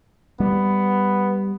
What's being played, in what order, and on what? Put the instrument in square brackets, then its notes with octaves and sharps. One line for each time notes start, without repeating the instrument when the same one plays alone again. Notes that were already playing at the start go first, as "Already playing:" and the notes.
[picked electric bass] G3 [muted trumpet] B3